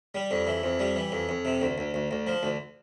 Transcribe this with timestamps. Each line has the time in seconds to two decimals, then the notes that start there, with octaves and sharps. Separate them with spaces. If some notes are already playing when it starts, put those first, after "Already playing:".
0.15 G3
0.31 F2
0.47 E3
0.63 F2
0.79 G3
0.96 E3
1.12 F2
1.29 F2
1.45 C3
1.61 D2
1.78 D2
1.94 D2
2.11 D2
2.27 F3
2.43 D2